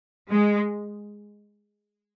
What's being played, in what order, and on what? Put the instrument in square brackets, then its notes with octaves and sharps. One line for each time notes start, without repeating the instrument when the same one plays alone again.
[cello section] G#3